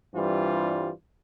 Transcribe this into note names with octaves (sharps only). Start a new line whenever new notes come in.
G2 E3 G3 C4 F4